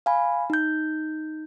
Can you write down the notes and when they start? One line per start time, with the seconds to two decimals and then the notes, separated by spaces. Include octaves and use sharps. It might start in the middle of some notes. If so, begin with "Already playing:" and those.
0.06 F5 G#5 B5
0.50 D#4 G6